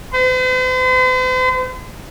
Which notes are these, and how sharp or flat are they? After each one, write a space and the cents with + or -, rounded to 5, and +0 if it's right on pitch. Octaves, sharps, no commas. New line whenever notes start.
C5 -45